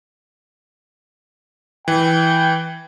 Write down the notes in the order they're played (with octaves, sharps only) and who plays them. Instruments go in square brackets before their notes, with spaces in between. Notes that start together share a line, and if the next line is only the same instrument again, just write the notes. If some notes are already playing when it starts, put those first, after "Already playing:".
[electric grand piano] E3 [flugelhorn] G5